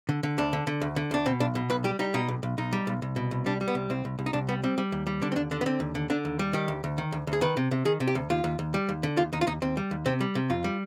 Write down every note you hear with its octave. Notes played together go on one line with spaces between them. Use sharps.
D3
D3
D2 D4
D3
D3
D2
D3
D2 D4
B2 C4
B1 D4
B2
B1 B4
G3 G4
G3 D#4
B2 D#4
B1
B1
B1 D#4
G3
B1
C2
B2
C2
G3 D4
G3
B3
C2
C2 C4
C2
C2
D#4
C2 D4
G3 B3
G3 C4
G3
D#2
G3
D3 D4
C4
D#2 D4
D3 D4
B3
D3 C4
D#2
D3
D3 D4
D#2
G3
D#3 G4
D2
D2
D#3
D2
D2
G#4
D#3 B4
C3
C3
D#3 G#4
C3
G4
D2
D#2 F4
D#2
D#2
G3
D#2
D3
D#2 F4
D#2 D#4
F4
D#2 D#4
D#2 C4
G3
D#2
C3 C4
G3
C3
F2 F4
G3